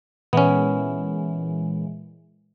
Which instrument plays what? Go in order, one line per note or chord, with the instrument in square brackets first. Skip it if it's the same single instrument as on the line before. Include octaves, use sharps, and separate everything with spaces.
[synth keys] A#2 E3 G#3 [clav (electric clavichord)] B3 C#4